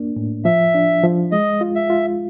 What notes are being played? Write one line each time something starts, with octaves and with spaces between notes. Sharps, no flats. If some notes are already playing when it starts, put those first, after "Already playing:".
Already playing: A#3 D4
A2
F3 E5
D4
F3
G#3 D#5
F4
E5
F4